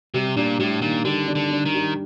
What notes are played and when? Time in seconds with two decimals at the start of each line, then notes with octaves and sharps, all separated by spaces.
0.14 C3 G3
0.36 A#2 D4
0.59 A2 G3
0.81 A#2 D#3
1.04 D3 G3
1.27 D4
1.35 D3
1.50 D4
1.66 D#3
1.73 G3